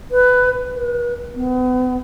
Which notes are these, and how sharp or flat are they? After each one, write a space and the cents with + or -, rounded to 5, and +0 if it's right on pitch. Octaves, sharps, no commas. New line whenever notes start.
B4 +15
B4 -40
B3 +40